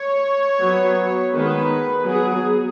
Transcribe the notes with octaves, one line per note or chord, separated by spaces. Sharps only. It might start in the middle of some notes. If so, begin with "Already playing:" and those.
Already playing: C#5
F#3 B3
D#3 G#3 B3 B4
F#3 B3 G#4